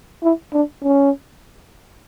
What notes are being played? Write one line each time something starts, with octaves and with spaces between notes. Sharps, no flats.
E4
D4
C#4